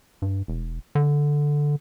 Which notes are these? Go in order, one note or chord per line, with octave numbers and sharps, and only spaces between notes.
G2
E1
D3